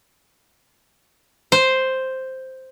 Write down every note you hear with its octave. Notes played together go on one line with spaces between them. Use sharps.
C5